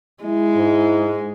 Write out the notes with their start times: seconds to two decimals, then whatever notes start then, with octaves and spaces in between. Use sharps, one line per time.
0.23 G#3 E4
0.57 G#2